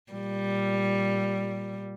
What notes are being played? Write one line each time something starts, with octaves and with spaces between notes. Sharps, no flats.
A#2 G3